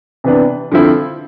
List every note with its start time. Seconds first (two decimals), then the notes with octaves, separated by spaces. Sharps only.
0.24 C3 E3 B3 D4
0.72 D3 F3 C4 E4